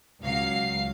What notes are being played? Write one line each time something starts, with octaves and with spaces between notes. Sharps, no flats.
C#2 F#3 F5 C7